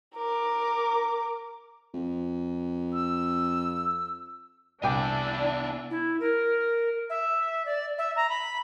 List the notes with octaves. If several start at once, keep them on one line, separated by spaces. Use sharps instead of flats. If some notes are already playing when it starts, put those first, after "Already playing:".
A#4 D6
F2
E6
C2 B3 D4 E4 G5 G#5 D6
E4
A#4
E5
D5
E5
A#5
B5